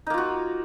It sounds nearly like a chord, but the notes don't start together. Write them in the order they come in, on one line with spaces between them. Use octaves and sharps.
D#4 A#3 F4 F#4